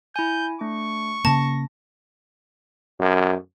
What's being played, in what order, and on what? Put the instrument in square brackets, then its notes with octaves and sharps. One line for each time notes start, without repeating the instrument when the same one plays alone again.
[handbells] E4 G#5 [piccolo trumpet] G6
[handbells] A3 D4 [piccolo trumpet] C#6
[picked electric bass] C#3 A#3 [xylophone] A5 [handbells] A#6
[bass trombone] F#2